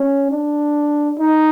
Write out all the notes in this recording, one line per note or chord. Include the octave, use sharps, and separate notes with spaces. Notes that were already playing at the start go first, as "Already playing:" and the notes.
Already playing: C#4
D4
D#4